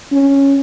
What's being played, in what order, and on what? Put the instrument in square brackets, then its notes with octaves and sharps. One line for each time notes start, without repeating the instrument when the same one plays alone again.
[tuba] C#4